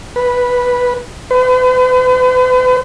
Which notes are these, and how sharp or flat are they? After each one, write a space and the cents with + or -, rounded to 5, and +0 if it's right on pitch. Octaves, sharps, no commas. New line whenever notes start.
B4 -5
B4 +45